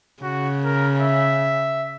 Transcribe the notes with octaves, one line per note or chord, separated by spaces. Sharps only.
C#3 F#4
A#4
E5